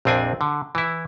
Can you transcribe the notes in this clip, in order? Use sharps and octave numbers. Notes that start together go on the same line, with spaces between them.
A#1 F2 C4 D4 G#5
D3
E3 E4